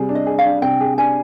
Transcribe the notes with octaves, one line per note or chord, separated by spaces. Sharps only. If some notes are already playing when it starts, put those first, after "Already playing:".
Already playing: C3 G3 G#4
D4
D#5
G#4
F5
D4
C3 G5
G#4
D4 G#5